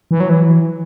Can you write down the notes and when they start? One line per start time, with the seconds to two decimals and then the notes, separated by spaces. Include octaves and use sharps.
0.11 E3
0.20 F#3
0.29 E3